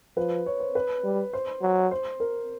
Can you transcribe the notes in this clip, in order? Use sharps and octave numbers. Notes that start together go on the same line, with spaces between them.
F3 B4
C#5
C5
B4
G3
C5
F#3
C5
A#4